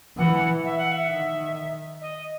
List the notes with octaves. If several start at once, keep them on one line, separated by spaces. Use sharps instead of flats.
E3 F#5
E5
F#5
E5
D#3
D#5